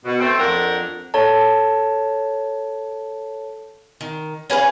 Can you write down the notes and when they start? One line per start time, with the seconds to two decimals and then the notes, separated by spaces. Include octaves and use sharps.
0.05 B2
0.19 A3 C4
0.38 F2 F3 D4 A#4 F#5
1.14 A4 C#5 A5
4.01 D#3
4.50 C#4 G#4 B4 F5